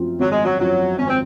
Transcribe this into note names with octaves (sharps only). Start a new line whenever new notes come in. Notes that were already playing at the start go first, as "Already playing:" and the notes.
Already playing: F#2 F3 C4 F4
G#1 F#3
G#3
F#3
F#2 F3 F#3 C4 F4
G#1 C#4
C4